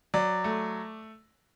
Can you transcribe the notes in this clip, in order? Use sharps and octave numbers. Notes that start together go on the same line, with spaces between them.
F#3 D5
A3